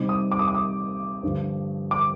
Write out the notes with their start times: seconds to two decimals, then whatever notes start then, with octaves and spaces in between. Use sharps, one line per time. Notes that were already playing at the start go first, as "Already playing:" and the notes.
Already playing: C3 G3 C4 D#4 D6
0.09 D#6
0.32 D6
0.39 D#6
0.48 D6
0.55 D#6
1.23 G2 D3 F3
1.91 D6